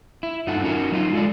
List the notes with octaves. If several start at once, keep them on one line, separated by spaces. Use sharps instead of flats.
E4
G2 D#4 F4 A4 F#5
C#4 D#4 F#4 A#4
F#3 D#4 F4
G#3 A4 D5